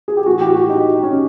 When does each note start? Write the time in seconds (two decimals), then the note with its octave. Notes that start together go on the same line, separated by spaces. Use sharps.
0.08 G#4
0.17 G4
0.26 A2 E3 F#4
0.41 G4
0.55 F#4
0.69 D#4
1.03 C#4